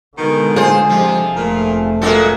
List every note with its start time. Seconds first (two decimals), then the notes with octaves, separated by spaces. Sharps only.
0.17 B2 D3 D#3 G#3
0.56 F4 G#4 C5
0.89 C3 F3
1.35 F1 F2 A#2 A3
2.02 A#2 G#3 F#4 A4